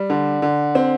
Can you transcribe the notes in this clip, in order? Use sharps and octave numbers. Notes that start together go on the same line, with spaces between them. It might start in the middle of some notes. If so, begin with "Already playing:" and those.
Already playing: G3
D3
D3
C4